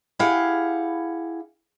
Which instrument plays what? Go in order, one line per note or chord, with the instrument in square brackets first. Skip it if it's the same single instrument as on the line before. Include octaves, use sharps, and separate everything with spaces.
[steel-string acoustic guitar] E4 G4 G#4 F5 F#5